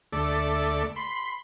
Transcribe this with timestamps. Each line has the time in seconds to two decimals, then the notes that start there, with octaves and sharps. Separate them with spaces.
0.13 D2 A3 A4 D5 E5 D6
0.96 B5 C6